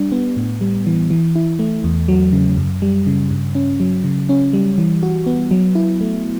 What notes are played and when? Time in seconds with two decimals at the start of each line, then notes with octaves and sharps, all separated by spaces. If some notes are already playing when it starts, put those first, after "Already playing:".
Already playing: G3 D4
0.12 B3
0.37 A2
0.61 G3
0.86 E3
1.10 E3
1.35 E4
1.59 A3
1.84 E2
2.08 F#3
2.33 C#3
2.57 F#2
2.82 G3
3.07 C#3
3.31 G2
3.55 C#4
3.80 F#3
4.04 C#3
4.29 C#4
4.53 G3
4.78 E3
5.03 F#4
5.26 B3
5.51 F#3
5.75 E4
6.01 A3